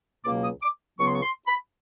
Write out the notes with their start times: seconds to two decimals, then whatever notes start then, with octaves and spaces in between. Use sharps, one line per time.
0.25 C#2 B2 F#3 A#3 D6
0.43 D#6
0.62 D6
0.98 C#2 C#3 F#3 B3 C#6
1.06 C6
1.13 C#6
1.23 C6
1.47 B5